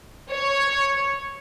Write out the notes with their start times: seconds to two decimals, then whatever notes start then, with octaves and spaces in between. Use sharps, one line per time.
0.32 C#5